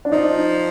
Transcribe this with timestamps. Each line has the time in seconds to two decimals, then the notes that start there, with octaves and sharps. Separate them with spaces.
0.05 D4
0.12 F3 D#4